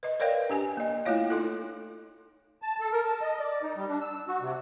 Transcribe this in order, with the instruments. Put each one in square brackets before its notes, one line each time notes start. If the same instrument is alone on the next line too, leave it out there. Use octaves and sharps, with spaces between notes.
[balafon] B4 D#5
A#4 B4 C#5 D5 F5 G5
D4 G4 G#5
A#3 D#5
A3 A#3 E4 F4 C#5 F5
D#4 F4 A4
[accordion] A5
A4
A#4
A5
D#5
D5
D#4
G3
D4
E6
F#4
C3